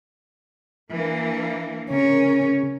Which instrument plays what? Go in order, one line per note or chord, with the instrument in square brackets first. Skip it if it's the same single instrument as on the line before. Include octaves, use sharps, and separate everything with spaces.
[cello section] E3 A#3 D4
[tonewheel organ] C#3 [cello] C#4 [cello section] A#4